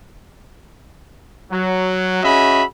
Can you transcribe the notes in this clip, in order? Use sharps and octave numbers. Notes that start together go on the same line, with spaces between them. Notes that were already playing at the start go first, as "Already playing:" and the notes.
F#3
C#4 F#4 G#4 D#5 E5 B5